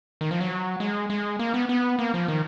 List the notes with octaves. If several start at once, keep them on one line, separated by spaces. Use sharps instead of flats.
D#3
F3
F#3
G#3
G#3
A#3
B3
B3
A#3
F3
D#3